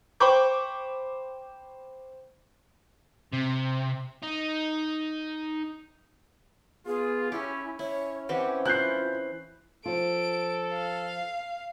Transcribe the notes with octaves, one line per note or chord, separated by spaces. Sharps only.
C5 G5 B5 C#6 D6 G6
C3
D#4
B3 F4 G#4
C#4 E4 G4
C#4 E4 C#5
E3 C4 G4 F#5
E4 F4 F#6 G6 C7
F3 F4 A4 D7
F5